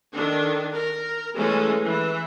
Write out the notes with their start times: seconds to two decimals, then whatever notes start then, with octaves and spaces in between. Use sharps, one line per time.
0.14 D#3 D4 A4
0.73 A#4
1.35 E3 G#3 A3 C#4 A4
1.85 E3 E5